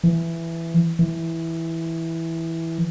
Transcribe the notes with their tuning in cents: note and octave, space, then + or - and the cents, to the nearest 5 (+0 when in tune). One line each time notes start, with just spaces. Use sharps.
E3 +10
E3 -5